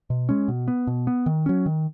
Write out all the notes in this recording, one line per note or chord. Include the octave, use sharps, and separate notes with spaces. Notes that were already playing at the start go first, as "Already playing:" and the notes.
B2
G#3 C#4
B2
B3
B2
B3
D#3
F#3 C#4
D#3